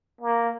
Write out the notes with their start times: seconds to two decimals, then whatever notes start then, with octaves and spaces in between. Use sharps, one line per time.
0.21 A#3